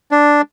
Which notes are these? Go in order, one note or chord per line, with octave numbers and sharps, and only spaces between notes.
D4